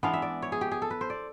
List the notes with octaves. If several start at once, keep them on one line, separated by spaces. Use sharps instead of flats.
E3 G#3 B3 D4 F5
E5
D5
C#5
G#4
G4
G#4
A4
B4
C5
D5